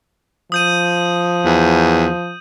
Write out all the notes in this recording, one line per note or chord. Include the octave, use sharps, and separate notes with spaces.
F3 D#6 G6 D#7
E2